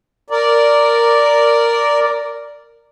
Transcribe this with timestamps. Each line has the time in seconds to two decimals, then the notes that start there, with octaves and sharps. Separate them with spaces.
0.30 A#4 D5